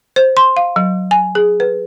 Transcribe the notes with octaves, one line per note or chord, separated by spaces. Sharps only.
C5
C6
F5
F#3
G#5
G#4
B4